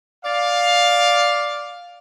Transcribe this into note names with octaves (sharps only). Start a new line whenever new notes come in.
D5 F5